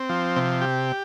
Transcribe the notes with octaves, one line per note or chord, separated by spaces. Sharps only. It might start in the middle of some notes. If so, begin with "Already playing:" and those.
Already playing: C4
F3
C3
G4